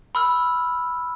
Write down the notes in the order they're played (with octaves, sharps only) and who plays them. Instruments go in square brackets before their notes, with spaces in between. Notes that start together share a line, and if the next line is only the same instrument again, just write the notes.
[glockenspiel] B5 E6 F6